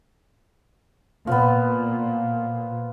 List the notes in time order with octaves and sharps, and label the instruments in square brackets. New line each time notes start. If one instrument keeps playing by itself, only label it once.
[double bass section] A#2 [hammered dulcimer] F3 B3